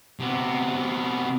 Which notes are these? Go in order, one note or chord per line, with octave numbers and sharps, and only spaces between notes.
C3 B3